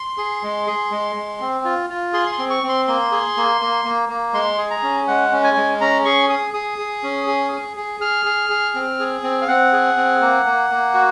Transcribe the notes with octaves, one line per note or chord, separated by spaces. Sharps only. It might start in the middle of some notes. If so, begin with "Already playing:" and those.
Already playing: C6
G#4
G#3
G#4
G#3
G#3
C4
F4
F4
G#4 C6
C6
C4
C#6
C4
C6
A#3 C6
G#4
A#3
A#3
A#3
A#3
G#3 C6
G#4
A#5
C#4
G#3 F#5
C#4
G#5
G#3
C#4 A#5
G#4 C#6
G#4 D#6
G#4 D#6
G#4
C#4
G#4
G#4
G#4
G#4 F6
G#4
G#4
C4
G#4
C4
F5
C4 F#5
G#4
C4
A#3
A#3
A#3
F#4